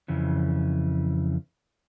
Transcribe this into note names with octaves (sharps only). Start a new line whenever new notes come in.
F2 C#3 E3